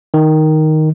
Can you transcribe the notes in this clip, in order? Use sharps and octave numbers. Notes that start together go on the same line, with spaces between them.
D#3